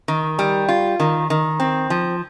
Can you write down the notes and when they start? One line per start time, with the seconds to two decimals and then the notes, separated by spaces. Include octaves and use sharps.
0.08 D#3
0.39 G3
0.69 F4
1.00 D#3
1.30 D#3
1.60 C4
1.90 F3